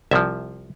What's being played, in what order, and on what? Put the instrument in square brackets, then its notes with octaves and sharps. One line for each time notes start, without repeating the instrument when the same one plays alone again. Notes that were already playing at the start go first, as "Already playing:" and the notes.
[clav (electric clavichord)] C2 C3 F3 E5